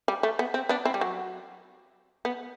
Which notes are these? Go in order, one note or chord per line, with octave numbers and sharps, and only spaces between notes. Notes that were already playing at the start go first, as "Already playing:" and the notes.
G3
A3
B3
C4
B3 D4
C4 E4
G3
F#3
B3